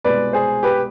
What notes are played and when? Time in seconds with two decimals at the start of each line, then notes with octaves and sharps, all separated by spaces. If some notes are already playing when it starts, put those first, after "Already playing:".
0.04 C2 B2 G#3 B4 D5
0.33 G#4 C5
0.63 G4 B4